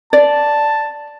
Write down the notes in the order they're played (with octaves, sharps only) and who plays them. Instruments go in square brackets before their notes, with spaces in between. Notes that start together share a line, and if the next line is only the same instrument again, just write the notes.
[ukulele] D5 [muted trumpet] A5